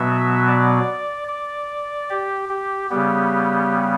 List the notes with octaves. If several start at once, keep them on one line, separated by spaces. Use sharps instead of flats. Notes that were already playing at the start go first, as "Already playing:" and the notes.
Already playing: B2 F#3 B3 E5
D5
D5
G4
G4
C#3 G3 B3 G4